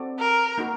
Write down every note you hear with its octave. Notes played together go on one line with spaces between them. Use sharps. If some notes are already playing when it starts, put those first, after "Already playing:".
Already playing: C4 F#4 A4 D5
A#4
A#3 D#4 F#4 A#4